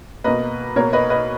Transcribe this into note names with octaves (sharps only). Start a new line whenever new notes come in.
B2 A#3 B4 D#5
B2 A#3 A#4 C#5
B4 D#5
B4 D#5